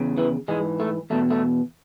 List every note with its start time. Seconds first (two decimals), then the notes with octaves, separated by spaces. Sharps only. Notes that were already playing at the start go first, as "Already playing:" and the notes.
Already playing: E2 C#3
0.18 E3
0.48 G#2 E3 G#3
0.80 A3
1.10 E2 B2 A3
1.30 A3